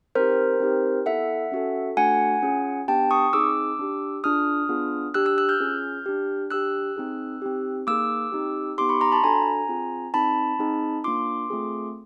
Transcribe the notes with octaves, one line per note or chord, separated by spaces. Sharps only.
C4 D#4 G4 A#4 C5
C4 D#4 G4
B3 E4 A4 E5 F#5
C#4 F#4 A4
A3 D4 F#4 A4 F#5 G#5
C#4 F4 G#4
B3 D4 G4 G5 A5
C#6 D#6
C4 D#4 G#4 D6 E6
D4 G4
D4 F4 G#4 D#6 F6
B3 D4 F4 G#4
D4 G4 E6 F#6
E6 F#6
E6 F#6
F6 G6
C#4 F4 G#4
D4 G4
D4 G4 E6 F#6
C4 D#4 G#4
C4 D#4 G4
A#3 D#4 G#4 D6 E6
C4 D#4 G4
B3 D#4 G4 C6 D6
B5 C#6
A#5 C6
A5 B5
D4 F#4 A4 G#5 A#5
C4 F4 G#4
C4 D#4 G#4 A5 B5
C4 D#4 G#4
A#3 D4 F4 C6 D6
A3 C4 F4 G#4